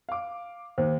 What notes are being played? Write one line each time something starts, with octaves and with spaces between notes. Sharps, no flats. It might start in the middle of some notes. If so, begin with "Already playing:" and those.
F5 D6
D#2 C5